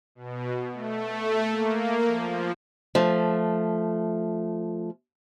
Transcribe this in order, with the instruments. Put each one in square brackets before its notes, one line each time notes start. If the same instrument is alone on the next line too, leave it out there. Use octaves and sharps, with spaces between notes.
[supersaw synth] B2
A3
A#3
F3
[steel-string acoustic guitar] F3 A3